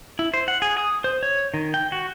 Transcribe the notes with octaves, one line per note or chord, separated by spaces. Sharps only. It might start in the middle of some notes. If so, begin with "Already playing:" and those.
E4
C5
F#5
G#4
D#6
C5
C#5
D#3
G5
F#4